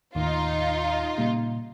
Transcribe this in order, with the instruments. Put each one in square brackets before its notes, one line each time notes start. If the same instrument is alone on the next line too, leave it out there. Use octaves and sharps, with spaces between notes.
[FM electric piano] D#2 A2 D#3 [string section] D#4 F4
[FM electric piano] A#2 C#3 G3